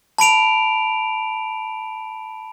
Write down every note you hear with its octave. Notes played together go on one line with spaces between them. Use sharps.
A5 B5 D7 F7